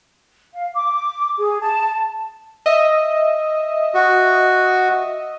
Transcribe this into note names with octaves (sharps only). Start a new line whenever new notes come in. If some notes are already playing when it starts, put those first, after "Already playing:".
F5
D6
G#4
A5
D#5 E5
F#4